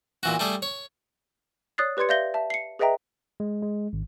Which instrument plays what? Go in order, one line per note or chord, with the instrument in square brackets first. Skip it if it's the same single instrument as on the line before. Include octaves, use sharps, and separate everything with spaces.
[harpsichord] A#2 E3 F#4
G3 A3 G#4
C#5
[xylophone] C#5 D5 D#6 F#6 A6 C7
G4 B4 D5 C6 G#6 C#7
D5 E5 F5 G6 A#6 G7
E5 A5
C7 C#7
G#4 B4 D#5 E5 G5 A#5
[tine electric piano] G#3
G#3
G#1